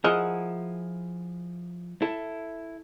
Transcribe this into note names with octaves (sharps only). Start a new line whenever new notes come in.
F3 E4 G#4 A#4 D#5 F#5
E4 A4